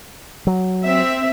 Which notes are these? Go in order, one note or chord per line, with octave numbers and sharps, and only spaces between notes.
F#3
C4 E5